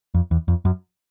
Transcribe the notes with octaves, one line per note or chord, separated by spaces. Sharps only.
F2
E2
F2
F#2